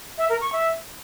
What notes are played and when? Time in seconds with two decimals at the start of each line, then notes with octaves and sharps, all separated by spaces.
0.18 E5
0.30 A#4
0.41 C#6
0.53 E5